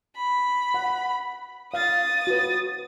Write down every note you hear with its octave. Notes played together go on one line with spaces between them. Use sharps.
B5
F#5
F5 D#6 A6
F#4 B4